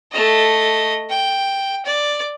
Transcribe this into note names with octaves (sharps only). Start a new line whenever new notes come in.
A3 D#5
G5
D5